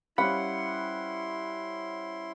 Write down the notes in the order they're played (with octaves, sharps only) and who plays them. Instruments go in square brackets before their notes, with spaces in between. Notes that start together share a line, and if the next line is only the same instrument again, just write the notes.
[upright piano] G3 C#4 C5 [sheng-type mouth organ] E4 C6 [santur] F#5 [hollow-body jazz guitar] B5